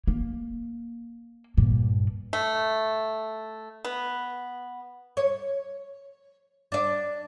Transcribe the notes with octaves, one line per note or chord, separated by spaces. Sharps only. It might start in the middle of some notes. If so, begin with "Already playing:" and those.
A#3
G2 A#2
A3
B3
C#5
D4 D5